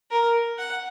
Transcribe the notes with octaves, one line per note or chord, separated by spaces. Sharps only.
A#4
F#5